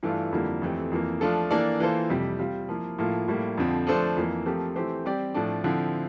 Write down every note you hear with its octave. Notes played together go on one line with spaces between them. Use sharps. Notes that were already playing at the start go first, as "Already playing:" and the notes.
G2 E3 A3 D4 F4
F2 D3 G3 A#3 E4
F2 E3 A3 C4 G4
F2 E3 A#3
F3 A3 D4 F4 A4
E3 A#3 D4 A4 D5
E3 A#3 F4 A4 C5
F2 C3 G3 C4 G4
G3 C4 F4
F3 A#3 E4
A2 F3 A#3 F4
A2 G3 A#3
F2 D3 F3 C4
F3 A3 D4 A4 C5
F2 E3 A#3
F3 A3 C4 G4 A#4
E3 A3 C4 G4 C5
G3 C4 G4 D5
A2 F3 A3 D4
D3 F3 C4 E4